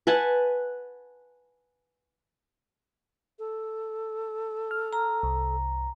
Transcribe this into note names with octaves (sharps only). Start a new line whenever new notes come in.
B4 F#5 G#5 A5
A4
F6
A#5
C2